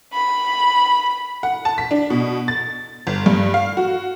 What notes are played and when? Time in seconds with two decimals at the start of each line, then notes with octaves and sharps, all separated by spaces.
0.14 B5
1.43 F#5
1.65 A5
1.78 B6
1.91 D4
2.10 B2
2.48 A6
3.07 G1
3.26 G2
3.54 F5
3.77 F#4